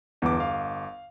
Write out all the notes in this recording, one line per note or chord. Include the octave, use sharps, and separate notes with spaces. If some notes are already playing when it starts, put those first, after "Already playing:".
G1 E2 B3 D6
F5